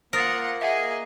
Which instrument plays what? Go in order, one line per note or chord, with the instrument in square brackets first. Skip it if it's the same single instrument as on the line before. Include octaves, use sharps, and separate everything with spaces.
[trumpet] A#3 [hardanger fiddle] F4 F#5 [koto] A#4 [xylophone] C5 D#6 A6
[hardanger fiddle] G#4 D#5 [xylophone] E5 F#5